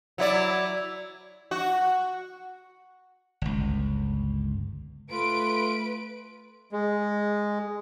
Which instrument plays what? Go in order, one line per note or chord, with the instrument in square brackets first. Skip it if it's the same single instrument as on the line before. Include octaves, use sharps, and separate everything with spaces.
[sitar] F#3 E4 D5
F#4
[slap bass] G1 C#2
[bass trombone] A3 [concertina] F4 [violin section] B4 D7
[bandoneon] G#3